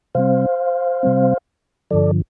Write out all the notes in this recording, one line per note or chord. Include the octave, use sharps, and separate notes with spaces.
C3 G3 C4 C5 F5
C3 G3 C4
G2 D3 F3 A4 D5